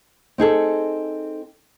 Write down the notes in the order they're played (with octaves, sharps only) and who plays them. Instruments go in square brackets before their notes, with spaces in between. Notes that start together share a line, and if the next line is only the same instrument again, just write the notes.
[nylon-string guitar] C4 D#4 G#4 A4